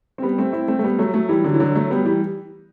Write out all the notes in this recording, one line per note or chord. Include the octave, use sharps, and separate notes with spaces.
C4
G3 B3
A3 C4
C4 E4
A3 C4
A3
G3 B3
F#3 A3
F#3 A3
E3 G3
D3 F#3
E3
D3 F#3
F#3 A3
G3 B3
E3 G3